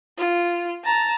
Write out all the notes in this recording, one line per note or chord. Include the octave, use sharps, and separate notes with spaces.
F4
A5 A#5